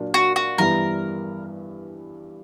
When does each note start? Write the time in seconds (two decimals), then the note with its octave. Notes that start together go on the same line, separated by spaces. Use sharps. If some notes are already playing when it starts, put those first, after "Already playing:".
Already playing: A#2 F#3 A#3 D4
0.14 F#4
0.36 F#4
0.58 G2 E3 G3 B3 E4 A#4